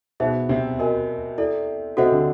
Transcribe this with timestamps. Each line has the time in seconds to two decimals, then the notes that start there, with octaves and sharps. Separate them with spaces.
0.20 B2 B3 D#4 G#4 C5 E5
0.49 C3 C4
0.79 F#4 A#4 D#5 G#5
1.38 E4 A4 D5
1.97 C3 C4 F#4 A4 C5 D#5 F#5
2.12 D3 D4